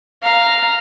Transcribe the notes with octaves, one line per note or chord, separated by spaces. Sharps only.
F5 A#5